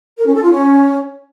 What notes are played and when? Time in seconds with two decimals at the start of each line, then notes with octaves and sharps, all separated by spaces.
0.17 A#4
0.26 C#4
0.34 A4
0.43 F4
0.51 C#4